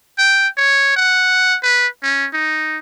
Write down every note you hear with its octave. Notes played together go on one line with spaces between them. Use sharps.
G5
C#5
F#5
B4
C#4
D#4